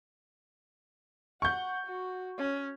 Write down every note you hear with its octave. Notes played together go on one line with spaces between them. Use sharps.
F#5 C#6 G6
F#4
C#4